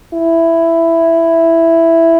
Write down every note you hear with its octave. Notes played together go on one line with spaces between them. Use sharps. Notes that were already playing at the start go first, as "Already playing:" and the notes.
E4